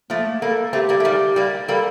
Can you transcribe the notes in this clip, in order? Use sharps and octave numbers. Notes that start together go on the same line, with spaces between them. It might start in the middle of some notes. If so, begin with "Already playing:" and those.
F3 A3 A#3
A3
A#3
G3 A#3 A4
A3 C4 G4
G3 A#3
A3
D#3 G3
G3 A#3
G3 A#3 A4